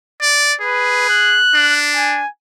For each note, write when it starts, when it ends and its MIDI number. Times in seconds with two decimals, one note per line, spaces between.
0.21 0.55 74
0.61 1.40 68
0.61 1.05 71
1.09 1.80 90
1.54 2.22 62
1.96 2.29 80